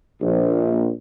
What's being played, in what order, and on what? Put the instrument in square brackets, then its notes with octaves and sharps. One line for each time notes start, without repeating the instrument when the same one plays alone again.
[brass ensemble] A#1